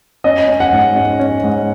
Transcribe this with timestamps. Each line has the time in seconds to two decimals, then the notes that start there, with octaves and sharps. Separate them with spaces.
0.24 C#4 D#5
0.47 C#4
0.60 F#5
0.72 G#2
0.96 C#4
1.20 C#4
1.44 G#2